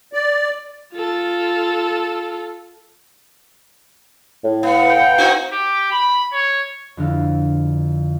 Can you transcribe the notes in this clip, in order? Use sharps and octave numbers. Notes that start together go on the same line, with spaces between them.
D5
F4 A4
A2
B3 F5 F#5 A#5
G5
C4 D#4 F#4
G4
B5
C#5
F2 D3 E4 F4 F6